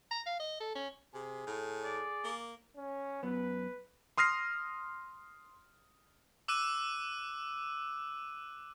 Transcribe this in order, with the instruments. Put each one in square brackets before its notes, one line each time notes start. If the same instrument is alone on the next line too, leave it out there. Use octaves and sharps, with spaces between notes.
[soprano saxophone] A#5
F5
D#5
A4
C#4
[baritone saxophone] C3 [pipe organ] G#4
[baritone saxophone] A2
[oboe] D5
[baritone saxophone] A#3
[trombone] C#4
[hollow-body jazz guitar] F#2 B3 [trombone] B4
[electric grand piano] C6 D#6 F6 A#6 C7
[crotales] D6 E6 F#6 D#7